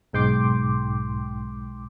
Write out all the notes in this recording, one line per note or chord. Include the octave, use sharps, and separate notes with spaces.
B1 G#2 G5 C6 D6